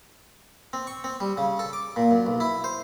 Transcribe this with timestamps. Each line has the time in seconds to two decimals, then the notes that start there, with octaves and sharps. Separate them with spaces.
0.73 C4
0.87 C#6
1.04 C4
1.20 G3
1.38 C#3
1.59 A4
1.73 D6
1.96 A#2
2.11 F#2
2.26 B1
2.40 E4
2.64 C5